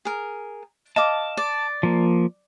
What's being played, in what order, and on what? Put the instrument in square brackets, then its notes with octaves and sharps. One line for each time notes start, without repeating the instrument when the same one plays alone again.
[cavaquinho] G#4 A#4
[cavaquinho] D#5 F5 D6 [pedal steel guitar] A5
[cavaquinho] D5
[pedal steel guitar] F3 A#3